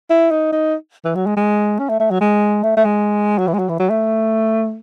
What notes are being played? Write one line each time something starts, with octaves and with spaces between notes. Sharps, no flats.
E4
D#4
D#4
E3
F#3
G#3
G#3
C#4
A3
A3
F#3
G#3
A3
A3
G#3
F#3
E3
G#3
F#3
E3
F#3
A3